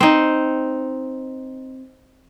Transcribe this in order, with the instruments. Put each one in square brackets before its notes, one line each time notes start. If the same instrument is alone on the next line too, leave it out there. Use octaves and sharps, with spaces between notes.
[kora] C4 D#4